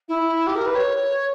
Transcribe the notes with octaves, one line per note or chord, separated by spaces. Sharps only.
E4
G4
A#4
B4
C#5